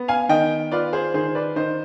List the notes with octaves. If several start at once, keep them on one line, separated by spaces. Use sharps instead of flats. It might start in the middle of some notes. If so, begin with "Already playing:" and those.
Already playing: B3
F5 G#5
D#3 D#5 G5
F4 B4 D5
G#4 C5
D#3 G#4 C5
B4 D5
D#3 C5 D#5